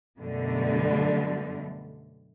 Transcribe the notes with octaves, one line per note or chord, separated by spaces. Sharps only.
F#2 B2 D3 G3 A3